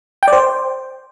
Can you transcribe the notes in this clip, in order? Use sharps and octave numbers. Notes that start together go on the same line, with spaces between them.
G5
D5
C5